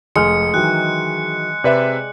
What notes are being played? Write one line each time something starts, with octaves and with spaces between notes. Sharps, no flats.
F1 G#3 F6 C#7
D#3 E3 F#3 F#6
C3 B4 D5 E5